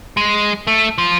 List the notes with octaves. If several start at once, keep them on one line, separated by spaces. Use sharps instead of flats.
G#3
A3
F3